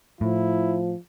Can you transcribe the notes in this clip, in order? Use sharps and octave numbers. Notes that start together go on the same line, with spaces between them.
A2 F3 E4